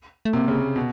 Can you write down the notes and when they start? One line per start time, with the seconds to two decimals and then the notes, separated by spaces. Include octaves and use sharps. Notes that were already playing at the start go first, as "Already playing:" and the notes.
0.25 A3
0.33 C3 A#3
0.48 C#3
0.76 B2